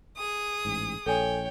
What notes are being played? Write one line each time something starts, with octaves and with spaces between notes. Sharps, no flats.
G#4 D#6
A1 G#2
A#1 A4 C#5 G5 G#5